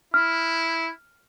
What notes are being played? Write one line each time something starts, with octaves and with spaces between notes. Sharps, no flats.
E4 F6